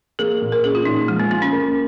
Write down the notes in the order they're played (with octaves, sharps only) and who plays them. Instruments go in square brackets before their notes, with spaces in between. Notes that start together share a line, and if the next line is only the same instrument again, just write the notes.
[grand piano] A#3 [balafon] G#4
[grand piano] A#2
[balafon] A#4
[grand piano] C#4 [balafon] G#4
[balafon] F4
[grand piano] A#2 [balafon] D#4
[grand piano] F3 [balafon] G#3
[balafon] A#3
[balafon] A#3 [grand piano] F4
[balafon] C#4
[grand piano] A#3